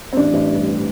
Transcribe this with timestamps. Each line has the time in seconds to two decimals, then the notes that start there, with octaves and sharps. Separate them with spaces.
0.13 C4
0.17 A1 D4
0.33 A1
0.51 G2